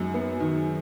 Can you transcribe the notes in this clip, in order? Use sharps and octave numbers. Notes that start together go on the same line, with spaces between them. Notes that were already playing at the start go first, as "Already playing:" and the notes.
Already playing: F#2 D#3 G#3
B3
D#3